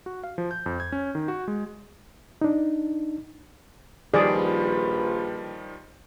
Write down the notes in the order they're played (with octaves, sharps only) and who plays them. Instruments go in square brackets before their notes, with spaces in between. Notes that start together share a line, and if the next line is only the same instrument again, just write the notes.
[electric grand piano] F#4
F5
F3
G6
F2
G#6
C#4
D#3
F#4
G#3
[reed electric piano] D4 D#4
[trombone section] A#1 F4 B4 [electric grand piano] D#3 F3 G3 [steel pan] G#4 D5